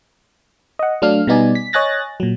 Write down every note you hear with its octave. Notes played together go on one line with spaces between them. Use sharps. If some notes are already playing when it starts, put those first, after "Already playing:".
D#5 F#5
F#3 A3 D4 F5 F6
B2 G3 B3 D#4 D5 G#5
B6
C#5 D#5 G#5 F#6 A6 A#6
A#2 F#3